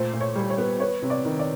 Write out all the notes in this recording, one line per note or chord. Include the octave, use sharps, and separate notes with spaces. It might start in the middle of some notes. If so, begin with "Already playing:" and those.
Already playing: A#2 A3 C5
A#2
C#5
G3
C#5
B3
B3 C#5
C3
D5
D#3
D5